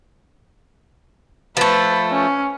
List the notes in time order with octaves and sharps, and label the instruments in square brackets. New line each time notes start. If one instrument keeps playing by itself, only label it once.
[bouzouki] F3 A3 [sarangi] B4
[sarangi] C#4